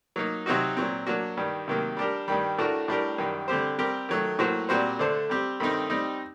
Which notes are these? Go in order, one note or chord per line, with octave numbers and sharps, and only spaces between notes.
F#3 A#3 D#4
C3 F#3 C4 D#4 F#4
A#2 F#3 C4
F#3 A#3 D4 F#4
G2 D#3 G3
C3 D#3 F#3 A#3
G3 D4 G4 A#4
G2 D#3 G3
A2 A3 D4 F#4 A#4
A2 G3 D4 G4 A#4
F#2 D#3 G3
D3 G3 C4 G4 C5
G3 C4 G4 A#4
D#3 F#3 A3
A2 F#3 A#3 F#4 C5
A#2 G3 C4 F#4 C5
D3 A3 D4 A4 C5
G3 C4 G4
G2 D#3 A3 C4 D#4
G3 C4 D#4